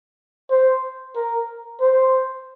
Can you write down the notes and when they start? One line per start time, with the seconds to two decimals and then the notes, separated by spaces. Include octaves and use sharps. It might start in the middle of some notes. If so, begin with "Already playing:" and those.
0.50 C5
1.15 A#4
1.80 C5